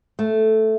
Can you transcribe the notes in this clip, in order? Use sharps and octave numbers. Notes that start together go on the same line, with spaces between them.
A3